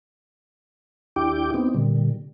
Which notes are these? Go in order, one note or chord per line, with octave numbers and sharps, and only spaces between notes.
D#2 D4 E4 G4 G5 D6
B3 C4 D#4
A#2 D3 G3